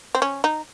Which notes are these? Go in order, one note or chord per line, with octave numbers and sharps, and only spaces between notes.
C4
C#4
D#4